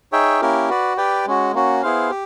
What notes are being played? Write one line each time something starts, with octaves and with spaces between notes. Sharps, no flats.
D#4 G#4 C#5 E5 G5
A#3 C#4 E4 G4 A#4
F#4 B4 D5
G4 B4 D5 G5
G#3 C#4 F#4
A#3 C#4 F#4
B3 E4 G#4 C5 F5
G4